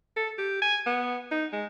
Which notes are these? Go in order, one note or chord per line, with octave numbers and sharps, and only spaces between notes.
A4
G4
G#5
B3
D#4
G#3